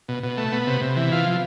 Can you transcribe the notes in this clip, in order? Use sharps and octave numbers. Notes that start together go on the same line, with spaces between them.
B2
B2
A3
B3
C3
C3
E3
F4
F3